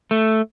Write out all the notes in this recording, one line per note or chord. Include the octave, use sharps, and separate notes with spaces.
A3